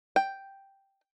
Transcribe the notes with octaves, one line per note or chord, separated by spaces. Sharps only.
G5